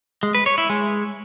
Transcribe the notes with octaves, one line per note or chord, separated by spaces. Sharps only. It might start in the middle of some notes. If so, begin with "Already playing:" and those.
G#3
B4
C#5
E4
G#3